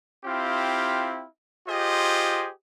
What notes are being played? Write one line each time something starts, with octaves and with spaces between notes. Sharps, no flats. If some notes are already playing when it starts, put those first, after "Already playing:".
C4 E4 F4 G4 F5
F4 G4 G#4 C5 D#5